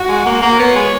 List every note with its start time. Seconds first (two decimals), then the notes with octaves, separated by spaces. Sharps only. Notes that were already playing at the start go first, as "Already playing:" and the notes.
Already playing: F#4
0.09 G#3
0.26 A#3
0.42 A#3
0.59 B3 C#5
0.76 G#3